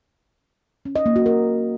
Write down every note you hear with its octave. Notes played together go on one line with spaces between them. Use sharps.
C#4
D#5
A#3
F#4
A#4